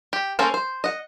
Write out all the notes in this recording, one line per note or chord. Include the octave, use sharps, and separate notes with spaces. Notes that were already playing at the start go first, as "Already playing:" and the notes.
G4
A#3 C#4 A4 A#4 C5
C5
D#5 F#5